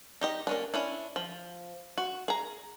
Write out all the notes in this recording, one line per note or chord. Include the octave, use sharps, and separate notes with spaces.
D#4 G4 D#5
A#3 C#4 D4
C#4 D4 E4
F3
F#4
G#4 A#5